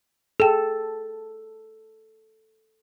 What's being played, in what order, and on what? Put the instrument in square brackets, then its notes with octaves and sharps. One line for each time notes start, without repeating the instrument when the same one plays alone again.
[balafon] G#4 G5 [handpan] A4